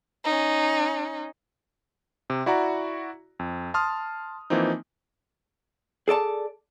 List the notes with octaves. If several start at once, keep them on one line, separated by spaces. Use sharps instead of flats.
C#4 D#4
C3
E4 F#4 D5 F#5 A#5
F2
A5 C6 D#6 F6
E3 F3 A#3 C4 D#4
G#4 A4 D5 A5